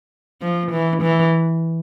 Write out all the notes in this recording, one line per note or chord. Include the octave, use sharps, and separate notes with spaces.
F3
E3
E3